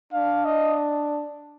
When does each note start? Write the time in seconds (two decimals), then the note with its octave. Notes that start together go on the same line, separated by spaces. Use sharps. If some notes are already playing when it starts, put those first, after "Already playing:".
0.13 D4 F5
0.45 D#5